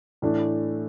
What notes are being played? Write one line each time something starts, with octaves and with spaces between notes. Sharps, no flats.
A2 E3 A3 D4